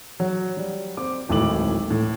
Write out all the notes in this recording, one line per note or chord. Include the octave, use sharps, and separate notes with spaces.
F#3
G3
C4 D6
D1 G#1 A2 A4 D6 F#7
A2